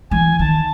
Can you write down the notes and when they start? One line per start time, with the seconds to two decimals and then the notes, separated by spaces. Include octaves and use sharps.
0.11 E3 G#5
0.39 D#3 A5